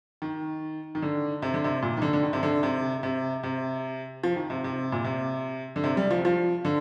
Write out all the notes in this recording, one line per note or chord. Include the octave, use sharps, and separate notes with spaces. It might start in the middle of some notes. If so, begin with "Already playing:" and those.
D#3
D#3
D3
C3
D3
C3
A#2
D#3
D3
D3
D#3
C3
D3
C3
C3
C3
F3
D#3
C3
C3
A#2
C3
D3
C3
G3
F3
F3
D3